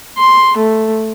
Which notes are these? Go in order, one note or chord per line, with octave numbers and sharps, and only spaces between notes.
C6
A3